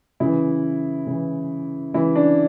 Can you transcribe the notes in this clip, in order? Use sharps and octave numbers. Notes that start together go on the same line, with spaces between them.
C#3 E3 E4
C#3 E3
C#3 E3 E4
D4